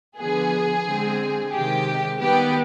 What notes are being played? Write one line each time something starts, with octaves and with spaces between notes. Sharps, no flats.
D3 F3 B3 G#4
D3 G#3 C4
C3 D#3 G#3 G4
D#3 G3 B3 G4